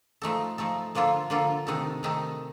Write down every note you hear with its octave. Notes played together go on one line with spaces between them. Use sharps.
F3 A3 D#4 A4
F3 A3 D#4 A4
D3 F3 A#3 F4 A4
D3 F3 A#3 F4 A4
C3 D#3 A3 D#4 A4
C3 D#3 A3 D#4 A4